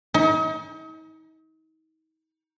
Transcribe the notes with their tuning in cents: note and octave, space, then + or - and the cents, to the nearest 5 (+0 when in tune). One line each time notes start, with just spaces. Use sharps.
D#4 +40